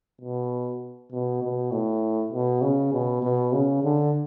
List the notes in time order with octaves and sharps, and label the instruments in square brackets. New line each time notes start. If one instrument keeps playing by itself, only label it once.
[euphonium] B2
B2
B2
A2
B2
C#3
B2
B2
C#3
D3